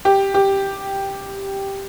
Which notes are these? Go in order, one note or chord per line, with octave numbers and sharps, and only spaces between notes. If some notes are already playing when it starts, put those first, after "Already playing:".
G4
G4